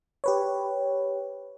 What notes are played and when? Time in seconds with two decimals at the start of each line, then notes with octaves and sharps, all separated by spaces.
0.24 G4 B4 C#5